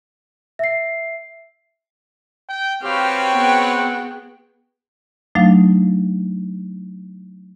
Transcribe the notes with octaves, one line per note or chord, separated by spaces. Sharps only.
E5 C7
G5
C4 F#4 G4 B4 C#5 F5 G5
B3 G#4 F#5
F#3 A3 D4 D#4 F5